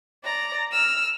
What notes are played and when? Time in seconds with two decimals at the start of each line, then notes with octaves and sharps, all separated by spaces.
0.24 D5 A#5
0.72 E6 F6